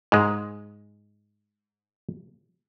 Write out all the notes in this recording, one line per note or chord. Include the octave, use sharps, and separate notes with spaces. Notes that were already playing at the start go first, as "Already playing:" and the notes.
G#2 G#3